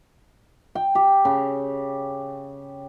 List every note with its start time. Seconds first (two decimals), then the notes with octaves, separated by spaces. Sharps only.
0.75 G5
0.95 G4
1.25 C#3